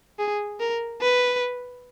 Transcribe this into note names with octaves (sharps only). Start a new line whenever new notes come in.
G#4
A#4
B4